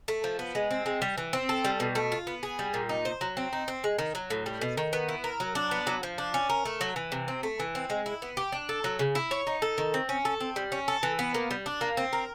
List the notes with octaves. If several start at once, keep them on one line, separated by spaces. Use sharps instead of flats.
A3
F3
B3
G#3
C4
G#3
G3
E3
C4
A4
G3
B2
A3
F4
B3
G#4
G3
A#2
D#4
C5
F#3
C4
D#4
C4
G#3
D#3
F#3
A2
G3
B2
D#3
B3
E4
A#4
F#3
D4
B3
F#3
F3
D4
C#4
A#4
A3
F#3
E3
C3
C4
A3
E3
C4
G#3
E4
B3
G4
D4
A4
F#3
C#3
E4
C#5
D#4
A4
D#3
C4
C#4
A4
C4
G3
C#4
A4
E3
B3
A#3
G3
D4
A#3
C4
A#4